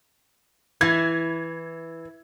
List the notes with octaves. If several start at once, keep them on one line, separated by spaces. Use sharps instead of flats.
E3 G#6